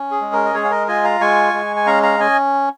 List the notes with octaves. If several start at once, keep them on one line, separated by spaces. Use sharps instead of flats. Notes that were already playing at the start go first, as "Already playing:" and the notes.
Already playing: C#4
G#4
G#3
A#4
D#5
G#3 G#4 C#5
F5
A#4 D#5
F4 D#5 G#5
F5 A#5
G#3 G#5 C#6
G#3
G#5
C#4 F5 A#5
F5 A#5
C#4 D#5 G#5